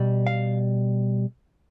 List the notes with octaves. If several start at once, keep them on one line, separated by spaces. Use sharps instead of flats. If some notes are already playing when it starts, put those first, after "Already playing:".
Already playing: B2 G3
F5